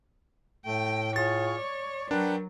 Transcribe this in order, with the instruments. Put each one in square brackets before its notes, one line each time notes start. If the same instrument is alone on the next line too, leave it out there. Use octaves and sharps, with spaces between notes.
[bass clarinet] A2 [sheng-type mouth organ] A3 [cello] G5
[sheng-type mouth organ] F4 G#4 [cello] C#5 [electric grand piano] A6
[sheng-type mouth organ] D5
[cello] F#3 [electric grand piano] D4 [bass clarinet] A#4 [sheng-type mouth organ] B4 F#5 G5